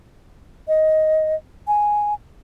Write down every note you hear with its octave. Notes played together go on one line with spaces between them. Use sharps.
D#5
G#5